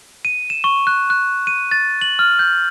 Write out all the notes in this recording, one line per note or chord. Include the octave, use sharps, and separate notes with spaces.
D#7
E7
C#6
F#6
F#6
D#7
A6
F#7
F6
G6